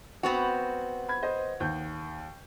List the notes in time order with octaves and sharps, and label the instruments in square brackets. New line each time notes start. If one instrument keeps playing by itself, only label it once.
[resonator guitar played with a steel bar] B3 C4 F#4
[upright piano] B5 G#6
B4 C5 D#5
D#2 G6